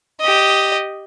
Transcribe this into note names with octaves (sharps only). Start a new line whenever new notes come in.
G4 D#5